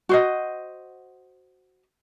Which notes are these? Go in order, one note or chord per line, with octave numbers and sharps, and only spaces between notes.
F#4 C5 D#5